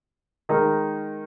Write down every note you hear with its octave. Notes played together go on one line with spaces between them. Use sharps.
D#3 G#3 D#4 A#4